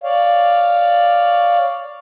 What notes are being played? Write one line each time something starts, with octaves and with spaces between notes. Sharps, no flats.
C#5 D5 F5